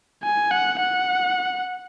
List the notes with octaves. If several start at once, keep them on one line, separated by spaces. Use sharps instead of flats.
G#5
F#5
F#5